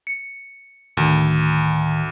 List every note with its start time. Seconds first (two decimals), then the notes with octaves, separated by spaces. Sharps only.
0.07 C#7
0.97 D2 A2 D#3